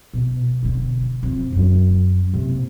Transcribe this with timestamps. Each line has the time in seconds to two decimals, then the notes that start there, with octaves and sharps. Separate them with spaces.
0.13 B2
0.63 B2 D3
1.23 F2
1.52 F#2 F#3
2.34 C3 A#3